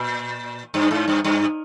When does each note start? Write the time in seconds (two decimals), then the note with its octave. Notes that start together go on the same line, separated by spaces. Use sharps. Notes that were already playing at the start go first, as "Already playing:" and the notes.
Already playing: A#2
0.74 G2
0.91 G#2
1.08 G2
1.24 G2